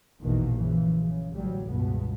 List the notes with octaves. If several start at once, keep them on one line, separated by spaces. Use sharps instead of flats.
A#1 E2 B2 D#3 E3 A#3
F#2 C#3 E3 F3
C#3
A1 D2 A2 F#3 G3
C#2 G2 B2 B3